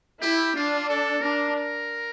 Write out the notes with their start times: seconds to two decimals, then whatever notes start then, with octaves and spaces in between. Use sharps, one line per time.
0.22 E4 G4
0.55 D4 F4
0.89 A4
1.22 D4 A#4
1.55 A#4